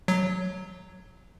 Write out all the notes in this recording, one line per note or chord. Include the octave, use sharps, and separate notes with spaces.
F#3